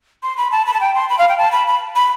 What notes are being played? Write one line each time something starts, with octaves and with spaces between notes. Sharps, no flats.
C6
B5
A5
B5
A5
G5
C6
B5
F5
G5
A5
B5
B5
B5